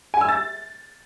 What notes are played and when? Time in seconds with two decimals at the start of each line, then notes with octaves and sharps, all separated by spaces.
0.14 G#5
0.21 E6
0.29 A6